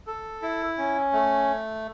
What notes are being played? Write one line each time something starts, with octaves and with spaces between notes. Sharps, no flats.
A4
E4
C#4
A3